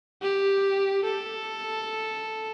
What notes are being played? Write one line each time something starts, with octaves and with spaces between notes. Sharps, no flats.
G4
A4